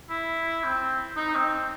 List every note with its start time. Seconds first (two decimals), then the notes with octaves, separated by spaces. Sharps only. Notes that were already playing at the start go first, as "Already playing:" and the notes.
0.10 E4
0.64 C4
1.16 D#4
1.35 C4